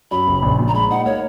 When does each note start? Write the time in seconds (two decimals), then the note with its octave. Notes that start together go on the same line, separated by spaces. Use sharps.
0.11 F#2 B5
0.28 F#1
0.42 A#1
0.59 A#2
0.68 A#5
0.74 G#3 B5
0.90 D#4 F#5
1.06 A#3 C#5